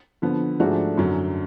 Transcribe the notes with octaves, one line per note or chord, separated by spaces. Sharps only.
D3 F3 B3
G#2 F3 A3 D4 F#4
F#2 D3 F#3